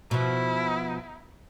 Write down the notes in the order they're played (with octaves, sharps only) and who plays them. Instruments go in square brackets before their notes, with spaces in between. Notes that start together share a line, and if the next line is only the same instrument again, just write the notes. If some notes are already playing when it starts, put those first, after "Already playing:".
[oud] B2 F3 [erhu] E4